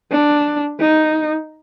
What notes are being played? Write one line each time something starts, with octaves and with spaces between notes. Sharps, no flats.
D4
D#4